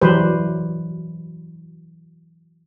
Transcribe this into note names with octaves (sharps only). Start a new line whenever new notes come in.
E3 F#3 G3 B4 C5